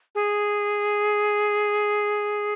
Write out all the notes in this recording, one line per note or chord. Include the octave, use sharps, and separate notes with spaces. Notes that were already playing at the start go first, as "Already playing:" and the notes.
G#4